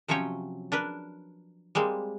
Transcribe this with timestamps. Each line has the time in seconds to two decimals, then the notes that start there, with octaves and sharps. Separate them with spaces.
0.08 C3 F3 F#3 C#4 C#5 G5
0.72 D4 A#4 B4
1.75 G3 G#3 A#3 C4